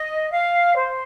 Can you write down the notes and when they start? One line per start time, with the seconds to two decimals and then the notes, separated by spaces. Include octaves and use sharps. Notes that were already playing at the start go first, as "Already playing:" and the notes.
Already playing: D#5
0.31 F5
0.75 C5